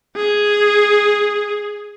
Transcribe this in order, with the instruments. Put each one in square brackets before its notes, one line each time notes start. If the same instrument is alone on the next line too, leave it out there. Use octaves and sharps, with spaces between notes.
[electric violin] G#4